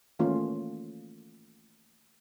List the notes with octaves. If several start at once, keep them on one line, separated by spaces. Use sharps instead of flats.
D#3 E3 A3 A#3 C#4 F4